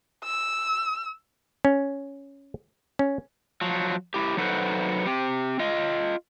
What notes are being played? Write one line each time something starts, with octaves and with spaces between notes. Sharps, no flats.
E6
C#4
C#4
F3 F#3
E4 G4
F#3 D#4 F#4 A4 B4 C5
C4 G4
F4 D#5